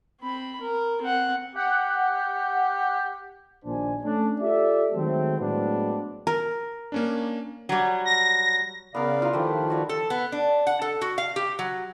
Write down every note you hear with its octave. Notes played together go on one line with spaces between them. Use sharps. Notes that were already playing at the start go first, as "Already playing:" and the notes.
C4 B5
A#4
C4 F#5
G4 F#5
A#1 D#2 A#2 D4 C5 G#5
A3 C#4 D4
F4 G4 A4 D5 E5
D#3 F#3 G#3 A3 C4
A2 F#3 G#3 B3 C4 D4
A#4
A#3 C#4 D4
F#3 G3
A#6
C#3 B3 A#4 D5 F5
E4 F4 A#4
D#3 F3 A3 G4 B4
F#4 C#5 D5
A4
B3
D4
F#5
A4
F#4
F5
G4
F#3